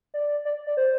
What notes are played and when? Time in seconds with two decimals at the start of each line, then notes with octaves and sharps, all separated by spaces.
0.14 D5
0.45 D5
0.67 D5
0.77 C5